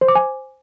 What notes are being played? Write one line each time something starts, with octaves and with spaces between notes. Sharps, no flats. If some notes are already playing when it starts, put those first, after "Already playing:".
C5
D6
G#5